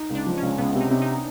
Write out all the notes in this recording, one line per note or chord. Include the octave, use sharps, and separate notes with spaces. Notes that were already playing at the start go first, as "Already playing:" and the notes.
Already playing: D#4
C#2
D4
F3
C#2 C#4
C#2 B3
C3
D#4
C3
D#4